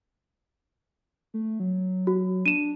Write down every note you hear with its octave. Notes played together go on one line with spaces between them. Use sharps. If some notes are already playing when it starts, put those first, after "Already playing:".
A3
F#3
F#4
D4 D#7 E7